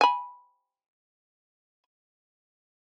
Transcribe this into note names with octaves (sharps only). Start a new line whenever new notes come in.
G#5 B5